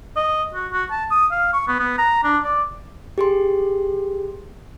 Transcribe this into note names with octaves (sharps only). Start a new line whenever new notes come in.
D#5
F#4
F#4
A5
D#6
F5
C#6
B3
B3
A#5
D4
D5
G4 G#4 C6